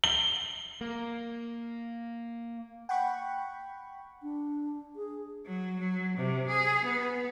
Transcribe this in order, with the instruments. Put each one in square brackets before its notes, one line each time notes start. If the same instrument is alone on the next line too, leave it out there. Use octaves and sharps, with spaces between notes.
[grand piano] G7
[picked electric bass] A#3
[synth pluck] F#5 G5 B5 C#6
[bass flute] D4
G#4
[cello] F#3
F#3
C3
G#4
B3